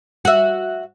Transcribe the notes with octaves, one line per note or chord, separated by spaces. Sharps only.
F#4 E5